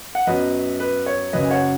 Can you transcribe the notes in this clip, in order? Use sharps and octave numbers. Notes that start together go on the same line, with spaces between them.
F#5
F#2 F#3 B3 B4 D#5
B4
C#5
F#1 F#2 C#3 F#3 B4 D#5
G#5
C#5 F#5